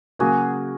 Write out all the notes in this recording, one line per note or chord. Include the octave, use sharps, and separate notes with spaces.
C#3 F#3 A#3 F#4 G#4